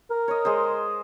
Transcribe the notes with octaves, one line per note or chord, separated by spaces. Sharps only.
A#4
C#5 D#5
G#3 G#4 C5